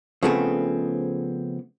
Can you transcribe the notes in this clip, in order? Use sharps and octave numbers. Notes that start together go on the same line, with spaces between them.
C#3 F3 A3 B3 C4 G#4